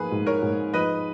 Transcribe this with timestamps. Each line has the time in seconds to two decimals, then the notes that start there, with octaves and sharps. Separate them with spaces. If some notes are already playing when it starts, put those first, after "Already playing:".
Already playing: G#2 F3 A#3 G#4 B4
0.11 G#2
0.26 A#4 C#5
0.42 G#2
0.74 F3 B4 D#5